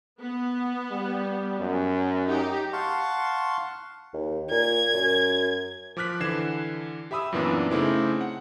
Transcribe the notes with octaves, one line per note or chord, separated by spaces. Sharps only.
B3
G3
F#2
D#4 G4
F5 F#5 A5 C6 C#6
D#2
A#2 G#6
F#2
F3 D6 F6 F#6 B6
D3 E3 G#6 C7 E7
G4 E5 B5 D#6 E6
F#2 A#2 E3 A#3 B3 D4
C#3 A3 C4 D#4 E4 D6
F#5